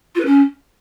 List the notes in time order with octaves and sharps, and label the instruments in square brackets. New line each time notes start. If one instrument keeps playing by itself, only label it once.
[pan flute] F4
B4
C#4